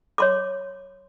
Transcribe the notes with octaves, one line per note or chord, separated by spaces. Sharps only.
C#5 C6 D6